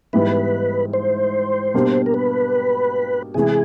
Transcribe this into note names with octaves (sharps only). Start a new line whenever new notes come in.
G#2 E3 G3 B3 E4 B4
C5
B2 G3 A#3 D4 G4
A#4
B4
C3 E3 G#3 G#4